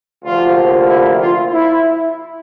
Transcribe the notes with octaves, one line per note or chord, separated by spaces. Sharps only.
D2 C3 F3 A#3 F4
E4
F4
E4